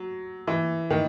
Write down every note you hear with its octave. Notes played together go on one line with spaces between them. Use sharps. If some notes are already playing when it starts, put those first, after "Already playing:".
Already playing: F#3
E3
D#3